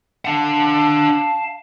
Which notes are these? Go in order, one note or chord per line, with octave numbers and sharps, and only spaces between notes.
D4 F5 F#5 A5